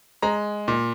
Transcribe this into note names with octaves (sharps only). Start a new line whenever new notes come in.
G#3 A#5
A#2